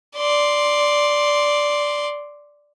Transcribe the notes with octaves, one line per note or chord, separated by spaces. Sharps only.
D5 C6